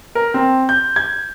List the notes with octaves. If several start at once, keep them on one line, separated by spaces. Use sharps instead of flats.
A#4
C4
G6
G#6